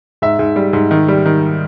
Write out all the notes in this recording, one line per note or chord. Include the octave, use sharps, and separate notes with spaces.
G#2 E5
G#2
G3
G#2
D#3
G3
D#3